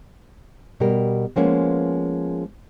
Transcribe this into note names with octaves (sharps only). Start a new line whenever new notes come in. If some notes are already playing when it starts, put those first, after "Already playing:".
B2 G3 G4 A#4
F3 G#3 A#3 B3 C#4